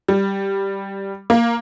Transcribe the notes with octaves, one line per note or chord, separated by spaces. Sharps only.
G3
A#3